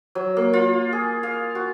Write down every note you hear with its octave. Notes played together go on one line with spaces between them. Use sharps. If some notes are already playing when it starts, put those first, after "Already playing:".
F#3
A#3
F4
G#4
F5
F#4